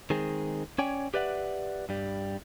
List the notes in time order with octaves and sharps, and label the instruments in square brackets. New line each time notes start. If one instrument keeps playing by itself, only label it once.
[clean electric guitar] D#3 G#3 C4 G#4
C#4 C#5 D5 G5 G#5
G4 B4 D5 E5 F#5
G2 G3